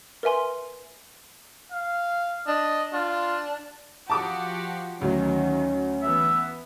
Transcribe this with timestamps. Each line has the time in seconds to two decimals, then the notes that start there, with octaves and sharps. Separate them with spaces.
0.23 A#4 B4 E5 G#5 C6
1.72 F5
2.47 D4 D#5
2.93 D4 F4
4.10 F3 F#4 G4 A5 D6 D#6
5.01 D2 D#3 F#3 C#4
6.02 E3 B3 E5